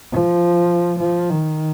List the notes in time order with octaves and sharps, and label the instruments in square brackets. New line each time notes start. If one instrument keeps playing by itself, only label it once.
[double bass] F3
F3
D#3